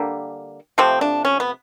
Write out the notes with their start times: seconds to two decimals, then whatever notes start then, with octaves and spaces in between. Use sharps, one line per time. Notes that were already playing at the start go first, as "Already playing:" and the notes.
Already playing: D3 G3 A#3
0.78 C3 F3 A3 C4
1.01 D4
1.25 C#4
1.40 B3